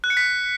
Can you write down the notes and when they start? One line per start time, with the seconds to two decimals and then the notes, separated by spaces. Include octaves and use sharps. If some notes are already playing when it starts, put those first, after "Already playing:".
0.04 F#6
0.10 C#7
0.17 B6